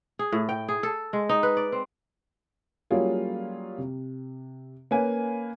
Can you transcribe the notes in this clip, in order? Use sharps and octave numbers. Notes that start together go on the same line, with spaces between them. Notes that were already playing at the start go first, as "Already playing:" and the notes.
G#4
A2
G5
G#4
A4
G#3
D#4
B4
D5
C4
F#3 G3 A#3 C#4 F4 G#4
C3
A#3 C#4 B4 C#5 G#5